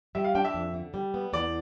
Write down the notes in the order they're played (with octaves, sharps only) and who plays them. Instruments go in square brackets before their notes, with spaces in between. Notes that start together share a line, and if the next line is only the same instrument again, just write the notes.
[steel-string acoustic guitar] G3 [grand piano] E5
[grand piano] F5
[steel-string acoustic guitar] D4 [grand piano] G5
[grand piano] E5
[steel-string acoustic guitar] F2
D3
G3
B3
[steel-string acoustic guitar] E2 [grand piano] D5